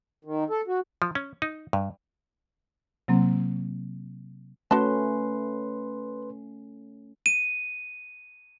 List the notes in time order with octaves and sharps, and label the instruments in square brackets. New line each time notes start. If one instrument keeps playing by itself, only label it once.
[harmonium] D#3
A4
F#4
[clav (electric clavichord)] F3
C#4
D#4
G2
[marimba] C3 F#3 A#3 C4
[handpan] A3 C#4 [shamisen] F#4 A5 [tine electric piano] B4 C6
[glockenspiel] D#7